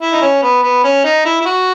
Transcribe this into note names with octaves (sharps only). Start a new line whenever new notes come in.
E4
D#4
C#4
B3
B3
C#4
D#4
E4
E4
F#4